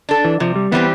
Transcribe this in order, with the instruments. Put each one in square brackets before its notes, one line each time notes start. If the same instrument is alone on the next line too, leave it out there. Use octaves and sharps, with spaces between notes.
[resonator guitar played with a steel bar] D4 A4
[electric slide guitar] E3
[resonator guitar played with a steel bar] C3 [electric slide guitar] F3
[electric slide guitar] G3
[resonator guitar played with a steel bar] E3 G3 C4 G4 [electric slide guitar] B3